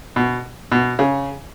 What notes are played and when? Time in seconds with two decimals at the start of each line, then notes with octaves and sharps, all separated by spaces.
0.16 B2
0.72 B2
0.99 C#3